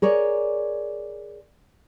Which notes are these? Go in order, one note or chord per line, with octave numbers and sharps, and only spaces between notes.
G#4 A#4 C#5 D5